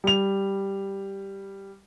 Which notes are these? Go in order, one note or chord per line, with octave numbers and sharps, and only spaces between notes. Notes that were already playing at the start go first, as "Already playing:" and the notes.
G3 F7